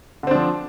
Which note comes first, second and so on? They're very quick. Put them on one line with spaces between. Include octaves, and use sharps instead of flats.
D3 C4 D4 F3